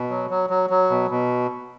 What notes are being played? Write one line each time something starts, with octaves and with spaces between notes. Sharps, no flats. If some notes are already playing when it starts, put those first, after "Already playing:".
Already playing: B2
F#3
F#3
F#3
F#3
B2
B2